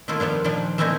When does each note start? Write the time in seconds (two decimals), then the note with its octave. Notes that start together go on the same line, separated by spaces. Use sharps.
0.08 D#3 A3 A#3 E4 F4
0.20 F3 G3 B3 D4
0.44 A#2 D#3 F3 G3 D4
0.78 E3 A3 A#3 C4 D#4 E4